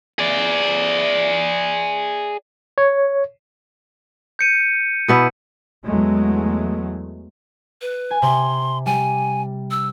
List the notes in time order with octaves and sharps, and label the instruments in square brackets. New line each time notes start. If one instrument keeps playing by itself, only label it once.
[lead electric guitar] G#4 D5
[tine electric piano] C#5
[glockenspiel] G6 C#7 D#7
[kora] B2 B3 E4
[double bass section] E2 F#3 G#3 A3
[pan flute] B4
[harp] G#5
[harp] C3 [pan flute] C6
[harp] G3 [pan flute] G#5
[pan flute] E6